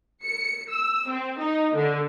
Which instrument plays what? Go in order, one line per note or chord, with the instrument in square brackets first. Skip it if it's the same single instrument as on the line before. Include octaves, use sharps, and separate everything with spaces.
[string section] C#7
E6
C4
D#4
D3